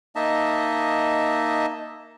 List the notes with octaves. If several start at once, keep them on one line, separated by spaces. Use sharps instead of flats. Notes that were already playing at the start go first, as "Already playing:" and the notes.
A#3 D#4 D#5 E5 A5